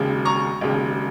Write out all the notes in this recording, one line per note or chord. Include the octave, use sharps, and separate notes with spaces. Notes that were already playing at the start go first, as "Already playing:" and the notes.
Already playing: E1 D#2 C#3
A#5 C#6
E1 D#2 C#3